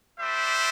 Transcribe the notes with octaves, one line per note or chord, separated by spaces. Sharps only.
G3 D4 C5 E5